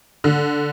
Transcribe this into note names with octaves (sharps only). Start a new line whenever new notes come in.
D3